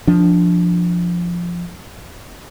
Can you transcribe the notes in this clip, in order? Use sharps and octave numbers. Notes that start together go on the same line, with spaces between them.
F3 D4